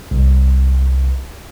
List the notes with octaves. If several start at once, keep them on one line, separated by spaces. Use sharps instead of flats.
C2